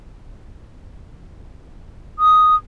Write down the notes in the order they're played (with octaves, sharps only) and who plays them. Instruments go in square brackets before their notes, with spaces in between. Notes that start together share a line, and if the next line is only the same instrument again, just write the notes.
[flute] D#6